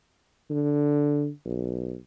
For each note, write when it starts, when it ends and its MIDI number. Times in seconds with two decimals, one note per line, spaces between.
0.50 1.29 50
1.45 1.95 35